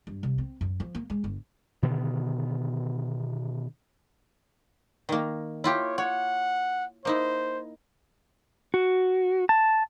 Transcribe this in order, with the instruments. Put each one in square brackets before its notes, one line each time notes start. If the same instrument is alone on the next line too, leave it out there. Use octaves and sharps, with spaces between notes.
[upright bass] G2
C2
C4
F#2
F3
A#3
G#3
G1
[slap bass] B2 D3 D#3 B3
[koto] D#3 A#3
[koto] E4 F4 G4 [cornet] C#5
[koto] C#5 [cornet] F#5
[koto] A#3 D#4 E4 [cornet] C5
[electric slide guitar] F#4
A5